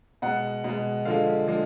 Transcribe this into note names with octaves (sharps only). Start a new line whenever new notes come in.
B2 G#3 F#5
B2 G#3
D3 F3 G#3 F5
D3 F3 G#3